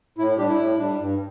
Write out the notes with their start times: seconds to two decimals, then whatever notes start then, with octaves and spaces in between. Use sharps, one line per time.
0.18 A2 E4
0.38 G3 D4 G4
0.48 E4
0.58 A2
0.78 G3 D4
0.99 G2